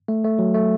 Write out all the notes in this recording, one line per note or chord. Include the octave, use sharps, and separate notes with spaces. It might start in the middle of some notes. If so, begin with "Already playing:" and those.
A3
A3
F#3
A3